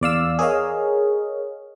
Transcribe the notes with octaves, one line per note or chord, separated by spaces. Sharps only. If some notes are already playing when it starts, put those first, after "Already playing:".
E2 D5 F5 E6
G#4 A#4 C#5 D#5 F5